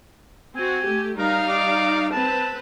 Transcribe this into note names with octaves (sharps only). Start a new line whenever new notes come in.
C4 F#4 G#5
A3 G4
G3 D#4 A#4 F5
D5
C4 B4 A5